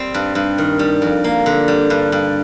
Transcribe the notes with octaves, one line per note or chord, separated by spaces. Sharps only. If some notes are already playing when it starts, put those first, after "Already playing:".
Already playing: G3 C4
G2
G2
D#3
G3
F2
A#3
D3
G3
G2
G2